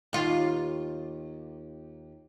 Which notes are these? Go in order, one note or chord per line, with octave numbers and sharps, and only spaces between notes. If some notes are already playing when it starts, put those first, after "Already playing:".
D#2 F4